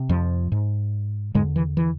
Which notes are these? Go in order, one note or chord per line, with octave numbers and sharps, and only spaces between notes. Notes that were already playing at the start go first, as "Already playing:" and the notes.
Already playing: C3
F2 F3
G#2
E2 G#2 D3 G#3
E3
E3